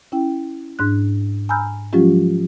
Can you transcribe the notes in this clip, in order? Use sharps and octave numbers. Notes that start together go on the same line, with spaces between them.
C#4 E4 G5
G#2 D4 F#6
G#5 A#5 B5 E6 F6 G6
F3 F#3 G#3 C#4 F4 G4